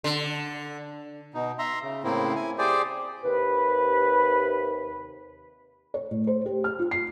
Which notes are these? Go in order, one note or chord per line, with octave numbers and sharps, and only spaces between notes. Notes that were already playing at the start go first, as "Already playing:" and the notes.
D3
B2 D#4
E5 A#5 C6
C#3
A2 C#3 A#3 C4 E4
E4 G#5
G4 G#4 C5 D5
D#2 C3 B4
C#5
A2
C5
G4
F6
F4
C7